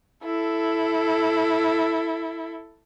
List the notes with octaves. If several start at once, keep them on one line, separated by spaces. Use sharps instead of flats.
E4 A4